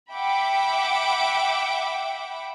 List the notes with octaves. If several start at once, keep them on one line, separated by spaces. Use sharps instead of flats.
E5 F#5 G5 B5 D6